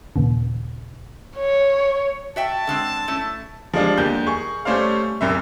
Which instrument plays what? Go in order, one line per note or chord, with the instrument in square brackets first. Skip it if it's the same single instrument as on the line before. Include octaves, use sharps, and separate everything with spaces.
[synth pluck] D#2 A#2 C#3
[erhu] C#5
[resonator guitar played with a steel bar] F#4 E5 G5 [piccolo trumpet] A5
[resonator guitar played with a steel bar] D3 G#3 C4
A3 C#4 E4
[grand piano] F3 G3 G#3 D4 F4
D#2 D3 G6
G#4 C#6
G3 A3 C#4 C5 D5 F5
D1 C2 F#2 E5